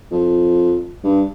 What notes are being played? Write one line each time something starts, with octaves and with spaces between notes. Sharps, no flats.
F2
G2